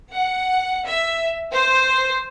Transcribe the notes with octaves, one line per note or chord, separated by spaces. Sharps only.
F#5
E5
C5